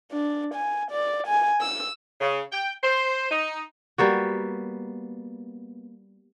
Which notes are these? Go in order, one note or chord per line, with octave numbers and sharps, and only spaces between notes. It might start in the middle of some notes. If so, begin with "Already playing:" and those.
D4
G#5
D5
G#5
E6
C#3
G5
C5
D#4
G3 A#3 B3 F#4